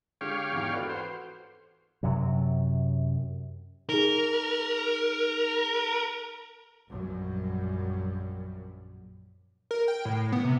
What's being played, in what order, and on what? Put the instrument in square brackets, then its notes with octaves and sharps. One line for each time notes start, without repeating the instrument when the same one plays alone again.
[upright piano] D3 G#3 [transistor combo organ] G4 C#5 F5
[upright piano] E2 G#2 E3
F#4 A4 B4
[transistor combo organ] C5
[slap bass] F#2 C3 F#3
[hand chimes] D#4 G#4 [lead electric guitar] A#4
[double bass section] A#1 F#2 G3
[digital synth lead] A#4
G5
A2
B3
C3